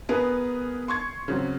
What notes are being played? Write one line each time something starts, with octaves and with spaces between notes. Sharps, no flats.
B3 G#4 A#4 B4
C6 C#6 G#6
C#3 F#3 C4